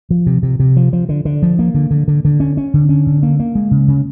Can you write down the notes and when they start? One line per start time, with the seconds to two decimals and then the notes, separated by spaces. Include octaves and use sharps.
0.10 F3
0.26 C3
0.43 C3
0.60 C3
0.77 F3
0.93 F3
1.09 D3
1.25 D3
1.43 F3
1.59 A#3
1.74 D3
1.91 D3
2.08 D3
2.25 D3
2.40 C#4
2.57 C#4
2.74 D3
2.89 C#4
3.07 D3
3.23 A#3
3.40 A#3
3.55 G#3
3.71 C#3
3.88 C#3